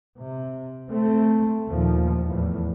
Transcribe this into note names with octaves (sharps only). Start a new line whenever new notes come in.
C3
A3 C4
D#2 A#2 F3
E2 A2